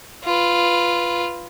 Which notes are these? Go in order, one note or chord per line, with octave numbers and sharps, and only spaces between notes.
F4 B4